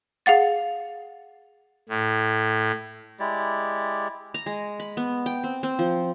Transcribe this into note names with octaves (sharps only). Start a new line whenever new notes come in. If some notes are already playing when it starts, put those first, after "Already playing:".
G#4 F5 F#5 A6
A2
G#3 E4 G4 D5
A#5
G#3
B5
B3
G5
C4
C4
F3